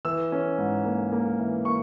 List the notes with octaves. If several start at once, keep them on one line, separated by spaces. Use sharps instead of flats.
E3 E6
C#4
G#2
A#3
A#3
E3
A#3 C#6